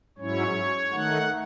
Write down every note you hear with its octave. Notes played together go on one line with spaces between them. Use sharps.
G#2 F#3 C#4 E4 C#5
D#3 A3 D#4 F#5